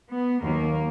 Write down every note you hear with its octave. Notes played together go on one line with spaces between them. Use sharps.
B3
D#2 D#3 F#3 A#3